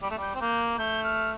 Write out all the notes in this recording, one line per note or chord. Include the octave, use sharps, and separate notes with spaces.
G3
A3
G3 G6
C4
A#3 G6
A3 G6
F6